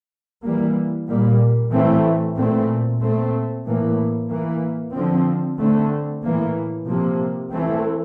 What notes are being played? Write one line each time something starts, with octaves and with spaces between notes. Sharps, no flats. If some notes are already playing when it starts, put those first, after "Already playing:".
E3 G3 A#3
A#2 G3 A#3
A2 E3 A3 C4
A#2 A3 C4
A#2 A3 C4
A2 E3 A#3
E3 A#3
D3 F3 C4
D3 A3 C4
A2 E3 A#3
C3 F3 A#3
E3 A3 C4